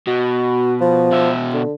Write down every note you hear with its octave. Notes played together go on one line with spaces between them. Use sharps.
B2 F#4
F3
B2 E5
D3